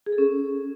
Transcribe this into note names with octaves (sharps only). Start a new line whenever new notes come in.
G#4
A4
C#4